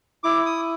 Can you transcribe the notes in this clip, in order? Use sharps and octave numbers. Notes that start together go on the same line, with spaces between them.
E4 D6
D#6